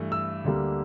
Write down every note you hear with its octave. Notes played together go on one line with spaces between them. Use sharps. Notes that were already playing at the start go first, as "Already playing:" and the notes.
Already playing: G2 E3 A3
E6
D2 D3 G3 A#3